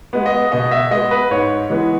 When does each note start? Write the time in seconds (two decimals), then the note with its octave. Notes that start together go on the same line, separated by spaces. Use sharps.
0.13 G#3 B3
0.26 D#5
0.52 B2 D#5
0.71 E5
0.91 G#3 B3 D#5
1.11 B4
1.31 G#2 C#5
1.70 E3 G#3 B3